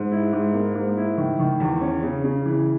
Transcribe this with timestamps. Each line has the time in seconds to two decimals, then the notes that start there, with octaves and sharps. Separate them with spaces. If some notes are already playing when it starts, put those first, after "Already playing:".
Already playing: G#2
0.11 E4
0.33 G#2
0.53 A#3
0.75 G#2
0.97 E4
1.18 D#3
1.39 D#3
1.60 E2
1.81 C#4
2.03 C#3
2.24 C#3
2.46 E3